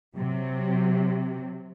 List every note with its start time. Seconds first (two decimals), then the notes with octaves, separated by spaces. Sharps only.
0.16 C3 F#3